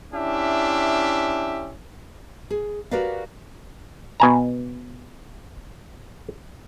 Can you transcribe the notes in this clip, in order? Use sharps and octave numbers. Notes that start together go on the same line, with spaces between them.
C#4 D4 E4 G4 E5
G#4
F#4 G4 A#4 B4 D5 F5
B2 G#5 A#5